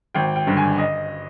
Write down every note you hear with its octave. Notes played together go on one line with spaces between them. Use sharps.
G#1 G5
G5
G2 D3
G#5
D#5